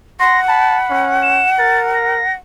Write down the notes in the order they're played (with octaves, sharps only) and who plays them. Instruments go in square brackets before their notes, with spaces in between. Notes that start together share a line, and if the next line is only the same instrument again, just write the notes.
[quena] F#5 [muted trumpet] C6 [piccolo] A#6
[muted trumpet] A5 [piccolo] B5
[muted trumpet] C#4
[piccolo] E7
[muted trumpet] A#4 [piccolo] A6
[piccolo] A#6